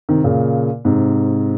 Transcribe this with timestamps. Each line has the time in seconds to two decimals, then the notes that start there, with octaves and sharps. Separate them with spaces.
0.09 C3 D#3
0.24 A#2 C#3
0.85 G#2 C3